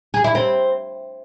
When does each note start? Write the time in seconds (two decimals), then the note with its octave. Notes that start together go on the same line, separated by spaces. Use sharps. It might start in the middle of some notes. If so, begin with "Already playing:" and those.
0.14 G#4
0.24 E4
0.35 C4